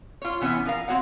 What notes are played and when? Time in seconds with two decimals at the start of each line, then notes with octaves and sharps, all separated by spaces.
0.22 F4 C#5
0.41 C3 E3 B3 C#4
0.65 F3 A#4 F5
0.88 G#3 C4 F#4 C#5 F#5